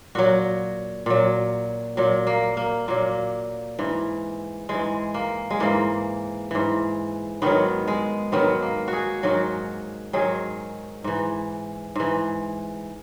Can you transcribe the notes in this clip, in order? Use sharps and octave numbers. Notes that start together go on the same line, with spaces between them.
A#2 F#3 F#4
A#2 F#3
A#2 F#3
A#3
A#3
A#2 F#3 A#3
G#2 E3
G#2 E3 G#3
A#3
G#3
G#2 E3 A#3
G#2 E3
G#2 D#3 F#3 B3
G#3
G#2 D#3 F#3 B3
A#3
F#4
G#4
G#2 D#3 F#3 F#4
G#2 D#3 F#3 G#4
G#2 E3
G#2 E3